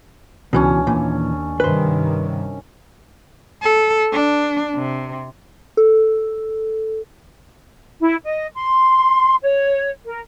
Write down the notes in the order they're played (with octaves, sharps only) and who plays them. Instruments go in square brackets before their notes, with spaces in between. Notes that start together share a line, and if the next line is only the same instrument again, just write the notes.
[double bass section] C#2 [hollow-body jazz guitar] B2 E3 [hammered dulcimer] C#4 D4
[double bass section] D#2 [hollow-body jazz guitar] A#2 E3
[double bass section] G2 C3 D#3 [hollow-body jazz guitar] B4 C5
[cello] A4
D4
C3
[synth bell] A4
[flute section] E4
D#5
C6
C#5
A#4